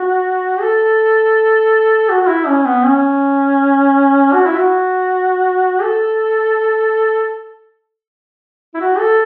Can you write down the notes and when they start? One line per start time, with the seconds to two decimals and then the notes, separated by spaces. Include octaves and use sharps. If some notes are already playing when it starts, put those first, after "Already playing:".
Already playing: F#4
0.61 A4
2.09 F#4
2.21 F#4
2.28 E4
2.47 C#4
2.65 B3
2.84 C#4
4.33 F#4
4.46 E4
4.57 F#4
5.81 A4
8.74 E4
8.80 F#4
8.98 A4